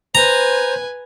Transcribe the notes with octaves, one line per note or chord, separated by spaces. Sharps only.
B4 C5 G#5 A#5